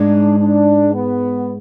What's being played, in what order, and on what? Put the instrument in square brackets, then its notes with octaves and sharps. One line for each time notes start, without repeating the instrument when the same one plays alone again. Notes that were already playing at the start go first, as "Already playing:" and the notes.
Already playing: [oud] G#2 G#3 [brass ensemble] D4
[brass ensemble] D4
B3